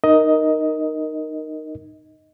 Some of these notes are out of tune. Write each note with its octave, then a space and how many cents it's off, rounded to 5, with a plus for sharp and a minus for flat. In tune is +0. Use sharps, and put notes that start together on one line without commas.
D#4 -15 A#4 +0 D#5 +10